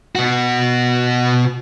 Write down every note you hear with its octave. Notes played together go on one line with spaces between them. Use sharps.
B2 F#4